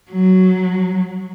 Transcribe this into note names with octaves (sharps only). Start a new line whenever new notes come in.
F#3